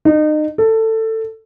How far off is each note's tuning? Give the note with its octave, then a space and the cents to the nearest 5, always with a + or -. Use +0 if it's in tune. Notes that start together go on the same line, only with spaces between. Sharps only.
D#4 -30
A4 +15